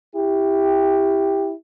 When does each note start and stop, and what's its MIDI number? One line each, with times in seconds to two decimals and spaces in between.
0.16 1.52 64
0.16 1.52 67